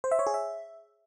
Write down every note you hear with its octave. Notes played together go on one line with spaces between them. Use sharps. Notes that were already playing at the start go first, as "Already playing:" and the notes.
C5
E5
C#5
G#4
E5